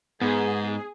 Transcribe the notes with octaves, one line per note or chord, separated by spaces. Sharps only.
G#2 B3 G#4